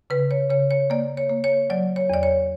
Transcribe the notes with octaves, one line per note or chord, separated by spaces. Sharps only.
C#3 B4
C#5
C#3 C#5
C#5
A#3 D5
C#5
A#3
C#5
F#3 D5
C#5
E2 D5
C#5